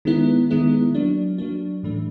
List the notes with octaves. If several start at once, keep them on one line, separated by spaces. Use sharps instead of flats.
D#3 G#3 B3 E4
D#3 G#3 B3 E4
F#3 A#3 D4
F#3 A#3 D4
A2 E3 A3 D4